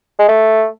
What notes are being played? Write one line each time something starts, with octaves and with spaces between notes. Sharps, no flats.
G#3
A3